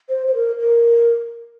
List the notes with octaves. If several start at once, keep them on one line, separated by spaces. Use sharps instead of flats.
C5
C5
A#4
A#4